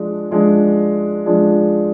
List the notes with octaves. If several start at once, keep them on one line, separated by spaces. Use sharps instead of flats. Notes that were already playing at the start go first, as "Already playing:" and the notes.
Already playing: F3 G#3 D4
F3 G#3 D4
F3 G#3 D4